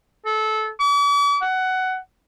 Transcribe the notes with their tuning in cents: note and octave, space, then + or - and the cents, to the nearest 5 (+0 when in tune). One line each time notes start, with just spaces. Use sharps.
A4 -20
D6 -45
F#5 +15